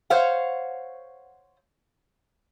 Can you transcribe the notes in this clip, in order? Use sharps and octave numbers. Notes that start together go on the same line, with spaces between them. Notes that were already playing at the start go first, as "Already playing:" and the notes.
C5 C#5 F5 F#5